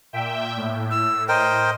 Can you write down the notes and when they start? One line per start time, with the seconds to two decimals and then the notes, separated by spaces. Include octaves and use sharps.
0.13 A#2 E5 G5
0.57 A2
0.91 E6
1.29 A#4 C5 D#5 G5